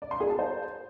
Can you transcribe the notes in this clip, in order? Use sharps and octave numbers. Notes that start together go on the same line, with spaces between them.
D5
C6
G#4
A5
C5